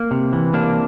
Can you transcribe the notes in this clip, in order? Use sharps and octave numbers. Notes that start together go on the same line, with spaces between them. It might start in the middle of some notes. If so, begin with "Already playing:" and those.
Already playing: A#3
C3
E3
C3 A#3 D4